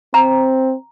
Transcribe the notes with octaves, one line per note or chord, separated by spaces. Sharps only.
C4 A#5